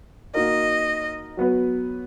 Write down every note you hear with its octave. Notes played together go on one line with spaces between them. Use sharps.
A#3 D#4 F#4 A#4 D#5
F#3 B3 F#4 B4